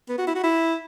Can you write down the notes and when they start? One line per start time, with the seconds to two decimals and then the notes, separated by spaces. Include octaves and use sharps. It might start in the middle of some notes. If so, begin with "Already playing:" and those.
0.09 B3
0.18 F#4
0.27 E4
0.36 F#4
0.44 E4